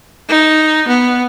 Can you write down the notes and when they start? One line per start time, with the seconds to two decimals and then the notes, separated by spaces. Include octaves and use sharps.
0.29 D#4
0.87 B3